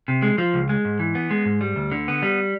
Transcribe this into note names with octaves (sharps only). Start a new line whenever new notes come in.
C3
G#3
F3
C#2
G#3
G#2
E3
B3
G#3
G#2
G3
D2
D3
B3
G3